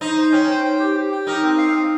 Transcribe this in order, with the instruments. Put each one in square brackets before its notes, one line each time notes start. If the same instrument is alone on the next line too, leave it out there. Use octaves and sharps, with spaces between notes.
[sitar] D#4 [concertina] C5
[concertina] C5
[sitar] C#4 [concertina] G5
[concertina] C5
G5
G4
G4
G5
[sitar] D#4 [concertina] A#4
[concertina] C4
F5
C4